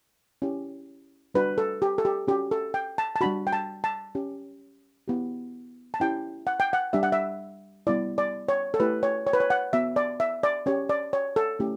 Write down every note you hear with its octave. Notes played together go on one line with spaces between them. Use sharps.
C#4 E4 G4
G3 D4 F#4 B4
A4
G4
A4
G4
C#4 F#4 G4
A4
G5
A5
A5
G3 D4 F#4 B5
G5
A5
A5
C#4 G4
B3 E4 G4
A5
C#4 E4 G4 G5
F#5
G5
F#5
G3 D4 G4 E5
F#5
E5
G3 B3 E4 D5
D5
C#5
A4
A3 E4 G4 B4
C#5
C#5
B4
C#5
F#5
B3 F#4 E5
D5
E5
D5
C#4 G4 C#5
D5
C#5
A4
A3 C#4 E4 G4